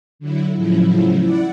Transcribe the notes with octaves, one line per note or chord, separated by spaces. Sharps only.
D3 F#3 E4
A2 C#3 F3 F#3 E4
E4 D5 F#5